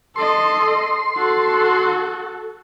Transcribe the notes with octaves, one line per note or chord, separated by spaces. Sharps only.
A4 D#5 C6
F#4 A4